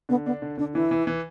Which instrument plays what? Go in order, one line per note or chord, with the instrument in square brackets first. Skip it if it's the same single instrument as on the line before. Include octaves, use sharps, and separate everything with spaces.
[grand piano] D3 [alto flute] B3
[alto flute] B3 [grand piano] D4
[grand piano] D3
[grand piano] D3 [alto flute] D4
[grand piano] E3 [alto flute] E4
[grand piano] E3
E3